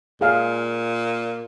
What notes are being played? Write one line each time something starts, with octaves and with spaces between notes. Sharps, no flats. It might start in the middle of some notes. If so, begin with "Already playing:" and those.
A#2 G#4 F5